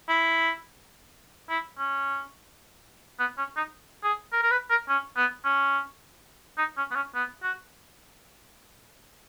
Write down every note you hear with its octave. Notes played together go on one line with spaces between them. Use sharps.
E4
E4
C#4
B3
C#4
D#4
G#4
A#4
A#4
B4
A#4
C#4
B3
C#4
D#4
C#4
B3
C#4
B3
F#4